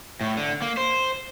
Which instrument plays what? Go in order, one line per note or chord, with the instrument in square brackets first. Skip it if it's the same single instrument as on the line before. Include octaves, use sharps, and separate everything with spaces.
[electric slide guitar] A2
D3
A#3
C5